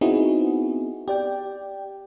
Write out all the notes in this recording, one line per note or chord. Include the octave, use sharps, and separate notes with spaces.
B3 C4 D#4 E4 F#4 G#4
G4 D5 G5